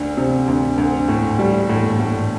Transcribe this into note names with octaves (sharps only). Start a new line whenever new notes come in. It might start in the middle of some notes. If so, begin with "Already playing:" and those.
Already playing: D2 D4
C3
D2
D2
A2
G3
A2
A2